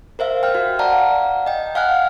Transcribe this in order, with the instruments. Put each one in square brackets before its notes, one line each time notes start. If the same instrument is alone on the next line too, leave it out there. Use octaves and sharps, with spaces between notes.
[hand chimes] A#4 C5 E5 F5
G5 F6
F#4
D5 F5 F#5 A5 A#5
D#5 G5
F5 F#5 G#5 F6 F#6